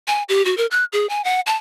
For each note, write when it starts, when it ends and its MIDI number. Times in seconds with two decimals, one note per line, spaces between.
0.08 0.23 80
0.29 0.44 67
0.45 0.57 66
0.57 0.66 70
0.71 0.84 90
0.93 1.08 68
1.09 1.24 80
1.24 1.41 78
1.47 1.55 81